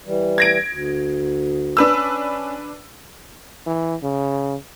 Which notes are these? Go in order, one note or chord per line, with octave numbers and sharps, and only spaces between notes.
E3 G3
G#6 A#6 D7
D2
C#4 D4 B4 E6
E3
C#3